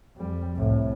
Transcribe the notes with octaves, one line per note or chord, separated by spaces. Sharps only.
F2 G3
C2 A2